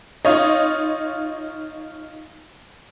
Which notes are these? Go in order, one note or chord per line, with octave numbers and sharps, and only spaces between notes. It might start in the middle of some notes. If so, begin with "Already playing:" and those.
D#4 F4 C#5 D#5